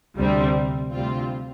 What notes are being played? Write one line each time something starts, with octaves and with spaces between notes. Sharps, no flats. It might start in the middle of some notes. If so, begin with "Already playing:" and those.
D2 C3 G3 C4
D2 C3 G3 C4 F4